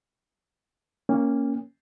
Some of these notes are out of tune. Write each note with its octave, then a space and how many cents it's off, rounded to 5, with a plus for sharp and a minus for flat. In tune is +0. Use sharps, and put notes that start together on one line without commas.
A#3 +0 C#4 +0 G#5 -45